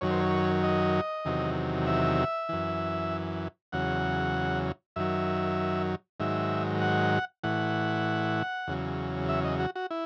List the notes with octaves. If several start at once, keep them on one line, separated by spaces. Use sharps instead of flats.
F#2 D#3 F#3 C#5
C5
C#5
D#5
E2 C3 D#3 F#3
E5
F#2 E3
E2 C#3 F#3 F#5
F#2 D#3 F#3 E5
G#2 D#3 F#3 E5
F#5
A2 E3 F#5
E2 C#3 F#3
E5
D#5
F#4
F#4
E4